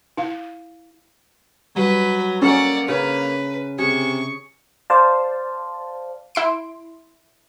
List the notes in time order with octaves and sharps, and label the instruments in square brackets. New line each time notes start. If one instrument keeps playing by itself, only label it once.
[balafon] E4 F5
[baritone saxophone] F#3 [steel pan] G3 [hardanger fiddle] B4
[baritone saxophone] A#3 [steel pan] C#4 C#5 [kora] A4 A#4 [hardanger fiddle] D5 F#5
[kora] C#3 [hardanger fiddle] B4
[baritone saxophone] C3 [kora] G#4 [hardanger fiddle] C#6
[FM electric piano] C5 D5 F5 A5
[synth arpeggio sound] E4 C6 D7